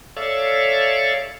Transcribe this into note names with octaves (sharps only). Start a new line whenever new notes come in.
A4 C#5 D5 E5 F5